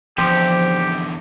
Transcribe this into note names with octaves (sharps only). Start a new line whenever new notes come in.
E2 D3 F3 C4 G4